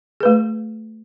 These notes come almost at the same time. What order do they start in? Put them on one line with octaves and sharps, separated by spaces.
G#4 B4 A3